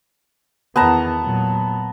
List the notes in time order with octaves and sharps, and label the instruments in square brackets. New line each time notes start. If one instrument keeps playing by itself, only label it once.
[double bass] E2 D#3 [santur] B3 A5 A#5
[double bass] A#2 F#3